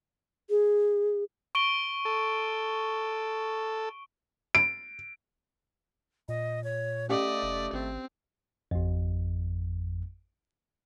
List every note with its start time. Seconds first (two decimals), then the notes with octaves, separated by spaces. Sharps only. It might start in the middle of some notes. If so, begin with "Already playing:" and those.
0.50 G#4
1.55 C#6 D7 G7
2.05 A4
4.55 D7
6.29 A#2 D#5
6.64 C#5
7.09 A3 C#4 G4 D5 D#5 F5
7.43 F1
7.73 G#1 C4
8.71 G#1 F2